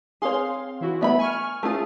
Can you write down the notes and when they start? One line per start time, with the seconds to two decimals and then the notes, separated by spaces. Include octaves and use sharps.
0.22 C4 G#4 C#5 F5 C6
0.81 E3 E4 F#4
1.01 A3 B3 D4 E5 B5
1.19 G#5 C#6 F6
1.63 A3 C#4 F4 G#4